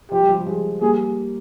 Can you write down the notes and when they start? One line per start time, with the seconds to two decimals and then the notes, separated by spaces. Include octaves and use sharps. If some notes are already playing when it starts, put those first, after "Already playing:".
0.11 F3 G4
0.20 G3
0.29 F3
0.37 G3
0.46 F3 G#3
0.81 G3 A#3 G#4